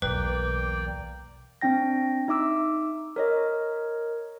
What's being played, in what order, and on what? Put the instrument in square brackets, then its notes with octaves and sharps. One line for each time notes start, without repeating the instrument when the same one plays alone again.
[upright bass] B1 E2 [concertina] A#3 D5 G5 [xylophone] B4
[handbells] C4 D4 G5 A#6
D#4 E5 D6 E6
A#4 C#5 D#5